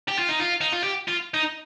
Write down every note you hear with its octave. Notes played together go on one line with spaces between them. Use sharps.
G4
F4
D#4
F4
D#4
F4
G4
F4
D#4